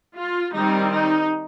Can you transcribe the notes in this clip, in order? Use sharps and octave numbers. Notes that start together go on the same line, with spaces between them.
F4
D#3 G3 C4 D#4
D#4